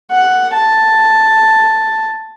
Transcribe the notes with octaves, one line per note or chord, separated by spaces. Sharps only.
F#5
A5